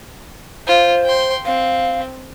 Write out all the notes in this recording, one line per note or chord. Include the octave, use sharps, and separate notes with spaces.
F4 C5
G5 C6
C4 F5